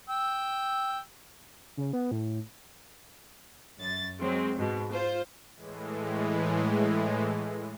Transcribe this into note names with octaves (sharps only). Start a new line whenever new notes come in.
G5 E6
C#3
B3
A2
F#2 A6
F#3 G#3 C4
G#2 B2
F4 C5
A2 E3 G#3